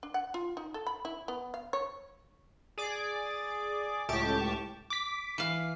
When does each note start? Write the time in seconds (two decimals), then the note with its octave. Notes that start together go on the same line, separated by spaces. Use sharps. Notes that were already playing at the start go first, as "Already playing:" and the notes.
0.03 D4
0.14 F#5
0.34 F4
0.57 D#4
0.74 A4
0.87 B5
1.05 E4
1.28 B3
1.54 F5
1.73 C#5
2.78 G#4 D5 D6
4.09 C#2 A2 G4 A5 C#6 D6
4.90 D6 B6
5.38 E3 F5